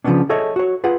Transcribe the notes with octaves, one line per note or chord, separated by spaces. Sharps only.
C#3 F3 G3 B3 C#4 D4
G#4 A4 C#5 D#5 E5
F#4 C#5
F4 G#4 B4 F#5